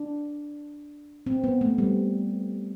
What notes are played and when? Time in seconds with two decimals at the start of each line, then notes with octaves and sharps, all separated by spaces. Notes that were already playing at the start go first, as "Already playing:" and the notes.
Already playing: D4
1.26 C4
1.44 B3
1.61 A3
1.78 G3